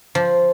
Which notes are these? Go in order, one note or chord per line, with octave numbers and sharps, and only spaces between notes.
F3